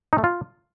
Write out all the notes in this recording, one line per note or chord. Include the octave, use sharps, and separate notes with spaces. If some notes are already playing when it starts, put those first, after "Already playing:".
D#4
A3
F4